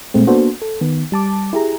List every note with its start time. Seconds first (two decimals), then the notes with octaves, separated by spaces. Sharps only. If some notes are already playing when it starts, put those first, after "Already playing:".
0.14 A#2 G#3 A3 C4
0.27 A#3 B3 D4 F#4 A4 C5
0.62 A4
0.81 D#3 B3
1.12 G3 A5 D6
1.53 E4 G4 G#4 A#5